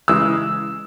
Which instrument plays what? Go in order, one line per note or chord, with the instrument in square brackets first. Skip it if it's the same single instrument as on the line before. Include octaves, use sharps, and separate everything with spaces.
[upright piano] C#3 E3 G#3 E6